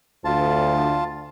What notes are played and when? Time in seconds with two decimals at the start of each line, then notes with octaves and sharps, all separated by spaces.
0.25 D2 F4 A5